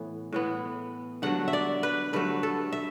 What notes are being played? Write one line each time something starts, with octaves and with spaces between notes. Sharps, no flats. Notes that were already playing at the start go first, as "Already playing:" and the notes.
Already playing: A2 E3 B3
A2 E3 B3
G2 D3 F#3 A3 F#5
E5
D5
B4
G2 D3 F#3 A3 B4
A4
E5